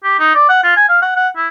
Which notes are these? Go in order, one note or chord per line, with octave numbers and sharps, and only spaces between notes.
G4
D#4
D5
F#5
F4
G#5
F5
F#5
F#5
E4